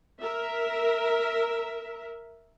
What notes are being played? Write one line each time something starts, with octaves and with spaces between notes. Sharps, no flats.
A#4 E5